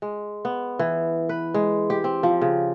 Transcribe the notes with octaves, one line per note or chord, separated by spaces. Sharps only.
G#3
B3
E3
B4
G#3
G4
C4
F3
C#3